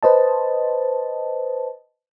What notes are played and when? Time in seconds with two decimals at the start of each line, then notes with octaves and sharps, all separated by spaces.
0.03 B4 C5 D#5 A5